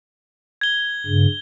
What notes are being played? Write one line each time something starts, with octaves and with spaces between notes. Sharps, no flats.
G#6 G7
G2 C#3